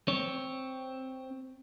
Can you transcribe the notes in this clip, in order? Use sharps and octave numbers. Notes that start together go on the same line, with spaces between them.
C4 C#5